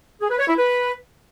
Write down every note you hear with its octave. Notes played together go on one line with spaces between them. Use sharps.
G#4
B4
C#5
E4
B4